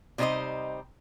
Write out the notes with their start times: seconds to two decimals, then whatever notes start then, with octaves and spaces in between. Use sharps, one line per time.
0.18 C3 G3 D#4 E4 C5 D#5